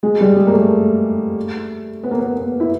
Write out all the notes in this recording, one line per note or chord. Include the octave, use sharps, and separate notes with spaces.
G#3
G3
G#3
A#3
A3
B3
A#3
B3
B3
E4